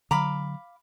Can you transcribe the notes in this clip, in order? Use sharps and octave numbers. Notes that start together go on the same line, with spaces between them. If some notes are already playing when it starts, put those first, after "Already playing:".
D3 F#3 F5 A#5 B5 D6